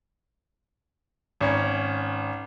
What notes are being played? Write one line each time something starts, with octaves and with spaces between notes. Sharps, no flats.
G#1 C#4